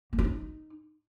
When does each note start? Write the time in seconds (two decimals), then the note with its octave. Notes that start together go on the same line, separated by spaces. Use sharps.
0.13 A#3
0.19 F4
0.24 D#4